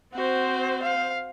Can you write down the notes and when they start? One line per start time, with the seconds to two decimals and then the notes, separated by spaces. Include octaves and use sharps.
0.14 C4 F#4 C5
0.83 F5